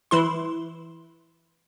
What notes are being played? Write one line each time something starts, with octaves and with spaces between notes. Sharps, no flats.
E3 E4 C6